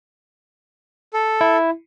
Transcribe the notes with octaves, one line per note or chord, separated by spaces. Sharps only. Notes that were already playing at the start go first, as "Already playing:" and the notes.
A4
E4